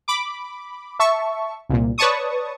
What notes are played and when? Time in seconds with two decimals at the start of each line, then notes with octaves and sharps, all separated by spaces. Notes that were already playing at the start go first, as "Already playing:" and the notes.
0.08 B5 D6
0.99 E5 A5 C#6
1.69 C2 A#2
1.98 B4 C#5 D5 A5 C#6 D#6